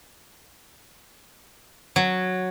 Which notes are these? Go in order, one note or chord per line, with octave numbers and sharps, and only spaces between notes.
F#3